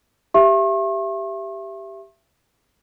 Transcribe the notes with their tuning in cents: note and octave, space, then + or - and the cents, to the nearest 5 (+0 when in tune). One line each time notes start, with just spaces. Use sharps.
G4 +0 E5 +20 C#6 -45